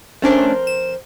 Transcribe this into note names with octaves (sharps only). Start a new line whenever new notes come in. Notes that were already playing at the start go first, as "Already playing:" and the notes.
F2 A3 C#4 D4 A#4 C5
E7